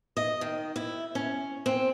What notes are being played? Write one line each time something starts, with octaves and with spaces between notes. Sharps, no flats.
D#5
D#3
E4
C#4
C4